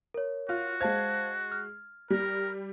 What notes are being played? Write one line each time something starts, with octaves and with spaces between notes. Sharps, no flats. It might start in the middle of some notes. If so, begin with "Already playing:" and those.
A#4 C#5
F4 F#4
G#3 C5 F5 A5 G#6
F6
G3 A#4